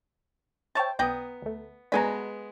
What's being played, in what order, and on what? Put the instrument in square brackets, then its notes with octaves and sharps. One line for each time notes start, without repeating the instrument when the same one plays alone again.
[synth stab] C5 G5 [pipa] C#5 E5 A5
[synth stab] B1 D#6 [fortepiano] B3 [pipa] D5 G5 A#5
[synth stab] D2 A3
[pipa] B2 G#5 B5 [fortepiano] G#3 B3 [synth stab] D4 A#5